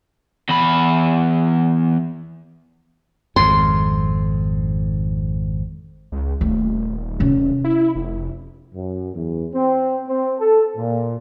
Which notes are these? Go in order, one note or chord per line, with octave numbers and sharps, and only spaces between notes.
E2 B5
G#1 F2 C6
C#2
D#1 A3
C3 C#4
E4
F1
F#2
E2
C4
C4
A4
A#2